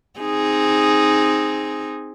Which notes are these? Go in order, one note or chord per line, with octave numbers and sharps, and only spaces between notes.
C4 D#4 G#4